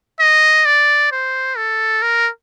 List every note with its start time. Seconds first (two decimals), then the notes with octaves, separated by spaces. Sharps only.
0.20 D#5
0.65 D5
1.12 C5
1.57 A4
2.02 A#4